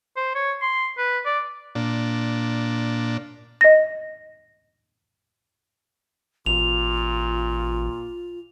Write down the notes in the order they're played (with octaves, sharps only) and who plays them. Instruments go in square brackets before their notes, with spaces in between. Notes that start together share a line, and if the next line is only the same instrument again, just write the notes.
[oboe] C5
C#5
C6
B4
D5
[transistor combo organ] A#2 D4
[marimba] D#5 A#6
[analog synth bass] A1 [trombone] A#2 [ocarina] F4 [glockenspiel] F7